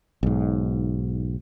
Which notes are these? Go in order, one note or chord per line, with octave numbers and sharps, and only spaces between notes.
B1 G#2